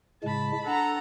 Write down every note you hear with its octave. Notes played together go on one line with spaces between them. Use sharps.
A2 C#3 G#3 A5 B5
D4 A4 F#5 A#5